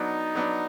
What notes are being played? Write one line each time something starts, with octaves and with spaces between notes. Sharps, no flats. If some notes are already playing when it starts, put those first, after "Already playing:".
Already playing: F#3 B3 D4 D#4
F#3 B3 D4